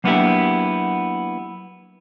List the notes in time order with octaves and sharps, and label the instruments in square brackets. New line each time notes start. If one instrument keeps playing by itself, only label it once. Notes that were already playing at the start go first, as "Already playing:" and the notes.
[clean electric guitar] F#3 A#3 B3 D4 E4 G4